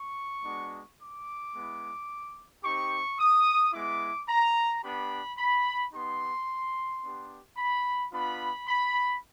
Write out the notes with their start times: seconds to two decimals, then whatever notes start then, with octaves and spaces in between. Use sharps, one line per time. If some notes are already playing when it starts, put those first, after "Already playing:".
Already playing: C#6
0.44 G#3 B3 D4 F#4
0.99 D6
1.54 G#3 B3 E4
2.63 C4 D#4 G4 C#6
3.19 D#6
3.73 G#3 B3 E4 D6
4.29 A#5
4.83 B3 D4 G4 B5
5.38 B5
5.93 B3 D#4 G4 C6
7.03 B3 D4 G4
7.57 B5
8.12 B3 D4 F4 B5
8.68 B5